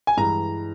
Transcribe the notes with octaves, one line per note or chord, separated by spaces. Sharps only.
G#5
G2 E3 G#3 A#5